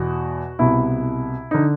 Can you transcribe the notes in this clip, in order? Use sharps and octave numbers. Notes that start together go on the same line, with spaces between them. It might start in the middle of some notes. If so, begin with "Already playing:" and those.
Already playing: E2 B2 F#4
C2 B2 E4
D3 D#4